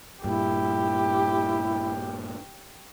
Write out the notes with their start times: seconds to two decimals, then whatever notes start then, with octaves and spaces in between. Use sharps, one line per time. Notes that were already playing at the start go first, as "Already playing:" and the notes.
0.24 G2 A#2 E4 G4